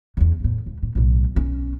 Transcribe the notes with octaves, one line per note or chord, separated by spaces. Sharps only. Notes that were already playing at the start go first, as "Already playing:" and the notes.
E2 C#3
E2 A2
C#2
A2
B1 A2
B1 C#4